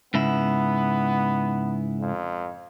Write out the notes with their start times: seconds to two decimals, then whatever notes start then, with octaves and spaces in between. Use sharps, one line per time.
0.14 G#2 C#3 B3 E4
2.00 F2